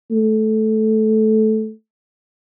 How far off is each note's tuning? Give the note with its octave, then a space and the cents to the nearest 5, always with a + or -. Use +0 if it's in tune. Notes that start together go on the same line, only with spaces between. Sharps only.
A3 -15